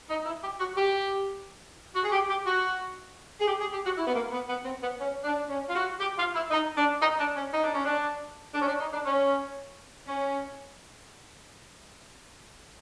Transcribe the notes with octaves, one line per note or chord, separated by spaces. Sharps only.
D#4
E4
G4
F#4
G4
F#4
G#4
G4
G4
F#4
G#4
G4
G#4
G4
F#4
E4
B3
A#3
B3
B3
C4
B3
C#4
D4
C#4
F4
F#4
G4
F4
E4
D#4
D4
D#4
D4
C#4
D#4
D4
C#4
D4
D4
C#4
D4
D#4
D4
C#4
C#4